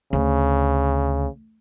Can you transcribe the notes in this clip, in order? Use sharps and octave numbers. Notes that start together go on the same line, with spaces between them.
D2 C#3